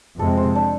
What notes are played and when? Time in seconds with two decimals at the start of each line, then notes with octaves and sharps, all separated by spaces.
0.19 F2 C3 G#3 C4 A4
0.37 C5
0.55 D4